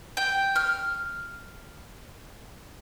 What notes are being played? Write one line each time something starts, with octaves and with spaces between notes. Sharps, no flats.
G5
F6